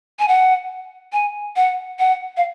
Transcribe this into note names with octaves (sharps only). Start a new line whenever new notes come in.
G#5
F#5
G#5
F#5
F#5
F5